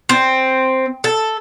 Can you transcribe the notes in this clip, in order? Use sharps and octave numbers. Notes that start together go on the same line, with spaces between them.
C4
A4